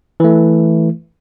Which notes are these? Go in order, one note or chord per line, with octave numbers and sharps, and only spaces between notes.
E3 A3